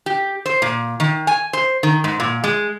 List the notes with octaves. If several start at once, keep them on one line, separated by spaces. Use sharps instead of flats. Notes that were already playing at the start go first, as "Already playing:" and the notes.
G4
C5
A#2
D#3
G#5
C5
D#3
G#2
A#2
G#3